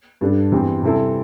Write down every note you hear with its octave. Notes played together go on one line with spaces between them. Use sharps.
G2 G3 D4 A4
E2 E3 G3 C4
C3 G3 C4 E4 A4